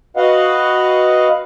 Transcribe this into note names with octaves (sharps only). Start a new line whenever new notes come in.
F#4 B4 D#5 F5 F#5